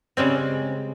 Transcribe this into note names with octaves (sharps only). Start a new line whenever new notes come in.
C#3 G3 G#3 C4